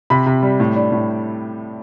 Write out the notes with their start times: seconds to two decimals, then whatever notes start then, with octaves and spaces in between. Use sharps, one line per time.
0.10 C3 B5
0.26 C3
0.43 G3
0.60 A2
0.76 D4
0.92 A2